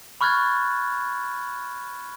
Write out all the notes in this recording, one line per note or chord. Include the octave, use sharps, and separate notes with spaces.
B5 C#6 F6 F#6 G#6 A6